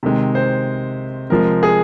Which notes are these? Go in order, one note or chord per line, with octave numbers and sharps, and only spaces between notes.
C3 D#3 G#3
C5
C3 F3 G#3 A#4
G#4